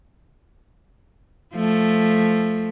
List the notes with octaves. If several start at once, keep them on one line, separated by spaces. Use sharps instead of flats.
F3 A3